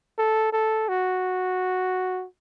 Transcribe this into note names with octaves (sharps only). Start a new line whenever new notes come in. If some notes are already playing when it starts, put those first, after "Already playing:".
A4
A4
F#4